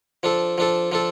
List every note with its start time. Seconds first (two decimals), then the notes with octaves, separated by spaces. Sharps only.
0.23 F3 D4 A4
0.58 F3 D4 A4
0.92 F3 D4 A4